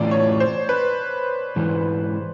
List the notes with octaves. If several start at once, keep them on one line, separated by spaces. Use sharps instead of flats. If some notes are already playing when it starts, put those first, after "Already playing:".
Already playing: A2 E3 A3 C#4 F4 D5
C#5
C5
B4
G#2 E3 G#3